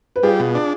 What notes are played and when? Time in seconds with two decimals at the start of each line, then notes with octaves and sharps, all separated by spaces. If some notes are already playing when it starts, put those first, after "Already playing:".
0.16 B4
0.23 G3 F4 G#4
0.39 B2
0.55 D4